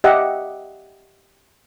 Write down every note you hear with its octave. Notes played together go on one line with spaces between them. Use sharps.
G4 D#5 E5 F#5